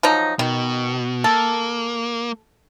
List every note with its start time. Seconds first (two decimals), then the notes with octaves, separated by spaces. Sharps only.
0.03 F3 F#3 D#4
0.39 B2 D#3
1.24 A#3 A4